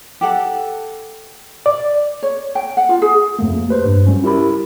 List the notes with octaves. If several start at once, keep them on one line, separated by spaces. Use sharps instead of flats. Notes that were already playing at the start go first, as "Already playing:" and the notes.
G4 A4 F#5
D5
C#5
G5
F#5
F4
G#4
F2 A3 A#3
G4 B4 C5
G2
G3 C#4
E4 G4 A#4 B5